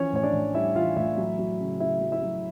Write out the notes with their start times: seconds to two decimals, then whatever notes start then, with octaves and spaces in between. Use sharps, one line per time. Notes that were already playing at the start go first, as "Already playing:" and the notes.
Already playing: E3 F3 C#4 C#5
0.13 A2 C#5
0.23 D4 D5
0.33 A2
0.54 G3 E4 E5
0.75 E3 F4 F5
0.96 A2 E4 E5
1.17 F#3
1.38 F#3
1.60 C#3
1.80 C#3 E4 E5
2.01 F#3
2.12 E4 E5
2.22 F#3